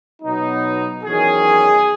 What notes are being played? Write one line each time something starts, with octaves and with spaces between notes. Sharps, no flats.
B2 F#3 B3 D#4
E2 D#3 F#3 C#4 G#4